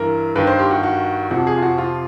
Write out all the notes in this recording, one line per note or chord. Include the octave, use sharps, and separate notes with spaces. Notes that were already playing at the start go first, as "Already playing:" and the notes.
Already playing: G2 E3 A#4
G2 D#3 B4
C5
G4
F#4
F#4
F2 C3 F3 F#4
G#4
F4
F#4
F4